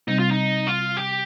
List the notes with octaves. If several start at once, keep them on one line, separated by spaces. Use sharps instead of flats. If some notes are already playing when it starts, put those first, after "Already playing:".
C3 G3 C4 D#4
F4
D#4
F4
G4